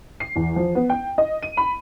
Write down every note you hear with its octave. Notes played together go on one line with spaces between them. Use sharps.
C7
E2
F3
B3
G5
D#5
D#7
B5